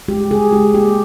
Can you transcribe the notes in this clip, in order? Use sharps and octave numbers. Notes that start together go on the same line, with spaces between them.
G#3 G4
C#3 G#4
G#3 G4
A#3 G4